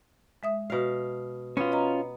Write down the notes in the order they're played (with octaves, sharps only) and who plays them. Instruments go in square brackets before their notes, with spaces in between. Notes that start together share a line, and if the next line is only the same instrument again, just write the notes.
[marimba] G#3 E5 D#6
[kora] B2 F5
[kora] B3 [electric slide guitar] C#4 F4
[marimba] D#5 A#5